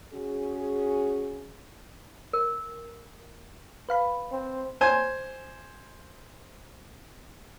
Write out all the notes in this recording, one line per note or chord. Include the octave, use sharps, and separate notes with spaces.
C#4 F#4 G#4
A#4
B4 F5 B5
C4
C5 G#5